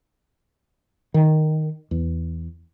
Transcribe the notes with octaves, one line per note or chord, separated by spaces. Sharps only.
D#3
E2